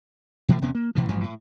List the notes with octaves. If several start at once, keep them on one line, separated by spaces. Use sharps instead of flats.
B2 E3 F3 A3
E1 C3 B3 C#4
A#3
A1 B2 E3 F3
A1 G2 F3 F#3
A2